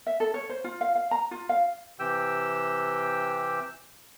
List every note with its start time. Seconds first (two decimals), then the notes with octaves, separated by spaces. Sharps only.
0.07 E5
0.20 A4
0.34 C#5
0.50 C5
0.64 F4
0.81 F5
0.96 F5
1.11 A#5
1.31 F4
1.49 F5
1.99 C3 E3 G4 G5 E6